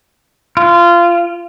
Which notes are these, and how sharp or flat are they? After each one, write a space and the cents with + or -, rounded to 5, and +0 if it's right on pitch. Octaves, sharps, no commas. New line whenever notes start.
F4 -20